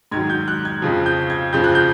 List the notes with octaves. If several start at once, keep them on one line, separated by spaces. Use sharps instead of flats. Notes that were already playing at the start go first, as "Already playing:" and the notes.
G#2 D#3 F#3 G#6
G6
F#6
G#6
F2 C#3 F3
G6
G#6
F2 C#3 F3 G6
F#6
G6